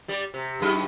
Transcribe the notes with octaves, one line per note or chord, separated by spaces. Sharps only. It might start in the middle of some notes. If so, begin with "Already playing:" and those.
G3 D5
C3
G2 F#3 D#4